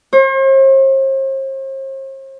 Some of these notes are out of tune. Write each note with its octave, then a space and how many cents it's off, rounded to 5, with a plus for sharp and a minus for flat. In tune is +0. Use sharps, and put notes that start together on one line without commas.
C5 +45